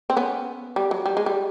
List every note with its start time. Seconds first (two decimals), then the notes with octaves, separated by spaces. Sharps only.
0.10 C4
0.17 B3 C#4
0.76 G3
0.91 F#3
1.06 G3
1.17 G#3
1.26 G3